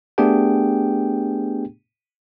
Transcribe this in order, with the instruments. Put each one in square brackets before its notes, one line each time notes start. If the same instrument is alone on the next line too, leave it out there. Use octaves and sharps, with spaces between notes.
[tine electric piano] A3 B3 D4 G4 G#4 G5